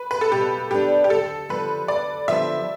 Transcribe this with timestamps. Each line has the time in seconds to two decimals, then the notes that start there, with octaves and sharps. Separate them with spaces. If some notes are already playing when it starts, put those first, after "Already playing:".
Already playing: B4
0.11 B4
0.21 A4
0.32 B2 G4
0.71 B3 D4 G4
1.04 G4
1.10 D2 A4
1.49 D3 F3 B3 B4
1.88 D2 D5
2.28 D3 F3 B3 E5